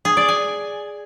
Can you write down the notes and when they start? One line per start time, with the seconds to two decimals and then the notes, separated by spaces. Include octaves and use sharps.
0.05 G#4
0.17 D5
0.28 G#5